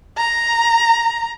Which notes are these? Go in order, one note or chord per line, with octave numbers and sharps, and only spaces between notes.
A#5